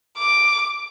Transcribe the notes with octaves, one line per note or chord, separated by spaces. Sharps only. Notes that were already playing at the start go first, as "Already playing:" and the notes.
D6